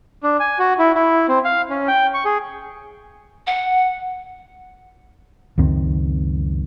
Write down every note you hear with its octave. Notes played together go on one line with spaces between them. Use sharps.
D4
G#5
F#4
E4
E4
C4
F5
C#4
G5
C#6
G#4
F#5
C#2 F#2 D#3 C4